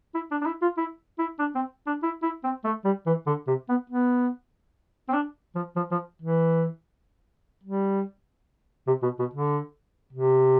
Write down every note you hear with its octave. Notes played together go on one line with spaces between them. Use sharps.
E4
D4
D4
E4
F4
E4
E4
D4
C4
D4
E4
E4
C4
A3
G3
E3
D3
C3
B3
B3
C4
D4
F3
F3
F3
E3
G3
C3
B2
B2
D3
C3